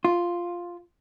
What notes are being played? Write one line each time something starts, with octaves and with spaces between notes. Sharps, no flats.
F4